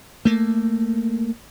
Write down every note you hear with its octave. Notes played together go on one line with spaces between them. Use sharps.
A3 A#3